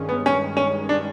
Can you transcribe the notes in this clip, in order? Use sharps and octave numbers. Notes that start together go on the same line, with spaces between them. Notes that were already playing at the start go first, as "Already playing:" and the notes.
Already playing: G2 D#3 G#3 C#4
B3
C#4
C#4
D4